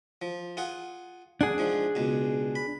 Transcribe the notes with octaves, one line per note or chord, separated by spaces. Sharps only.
F3
F4 G#4 F#5
D4 G#4 F#5
G#2 F3
C#2 B2
B5